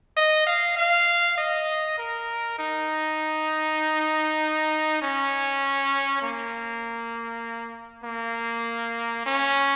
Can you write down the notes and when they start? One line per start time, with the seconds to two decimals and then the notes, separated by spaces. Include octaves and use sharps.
0.16 D#5
0.47 F5
0.77 F5
1.38 D#5
1.98 A#4
2.59 D#4
5.02 C#4
6.22 A#3
8.04 A#3
9.26 C#4